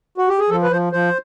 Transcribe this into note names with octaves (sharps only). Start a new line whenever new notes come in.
F#4
G4
G#4
F3 A4
B4
F3 C5
F3 C5